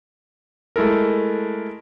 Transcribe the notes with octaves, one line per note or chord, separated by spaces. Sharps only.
G#3 A3 E4 A4 A#4